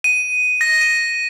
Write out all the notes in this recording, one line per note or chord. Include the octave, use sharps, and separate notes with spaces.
D#7
A#6
D#7